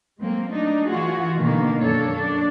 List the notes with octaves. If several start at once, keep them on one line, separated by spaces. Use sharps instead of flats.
F#3 G#3 A#3 C4
A3 D4 D#4
E3 F4 F#4 G#4
B2 D3 D#3 A#3
F#2 A#3 D4 A4 C#5
D4